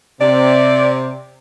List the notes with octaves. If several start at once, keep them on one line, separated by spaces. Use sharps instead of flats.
C3 D5